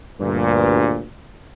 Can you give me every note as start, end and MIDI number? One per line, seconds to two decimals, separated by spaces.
0.20 1.03 38
0.20 1.03 43
0.20 1.03 46